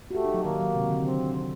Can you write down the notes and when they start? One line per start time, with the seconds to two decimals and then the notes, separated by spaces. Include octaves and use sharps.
0.11 F#4
0.15 A3 G4
0.25 D#4
0.34 F#3
0.44 D#3 A#3
0.60 F#3
0.75 C3
0.90 D3
1.06 C4